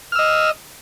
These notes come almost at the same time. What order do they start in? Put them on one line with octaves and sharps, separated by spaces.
F6 E6 D#5